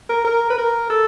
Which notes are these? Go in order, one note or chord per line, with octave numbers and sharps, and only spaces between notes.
A#4
A#4
B4
A#4
A4